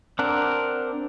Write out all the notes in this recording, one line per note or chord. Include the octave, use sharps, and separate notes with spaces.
C4 D4 A#4 F#5